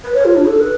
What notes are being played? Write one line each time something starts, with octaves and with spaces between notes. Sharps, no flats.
B4
C#5
F4
D4
A4
B4